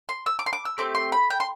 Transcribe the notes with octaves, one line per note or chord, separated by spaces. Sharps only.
C6
E6
D6
C6
D6
E6
A3 C4 G4 D6
C6
B5
G5
C6